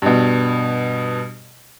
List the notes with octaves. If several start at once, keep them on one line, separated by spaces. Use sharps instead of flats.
G2 B2